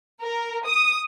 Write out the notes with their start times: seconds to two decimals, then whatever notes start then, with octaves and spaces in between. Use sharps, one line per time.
0.22 A#4
0.67 D#6